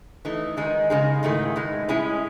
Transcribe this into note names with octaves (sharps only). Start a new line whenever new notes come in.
E3 A3 D#4
D#3 G#3 D#4 G#4
C#3 G#3 D#4 G#4
G#2 D#3 A3 E4 G#4
B2 G#3 D#4
A2 G#3 C#4 E4 G#4